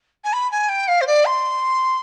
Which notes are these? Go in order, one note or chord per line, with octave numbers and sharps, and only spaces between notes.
G#5
B5
G#5
G5
F5
C5
D5
C6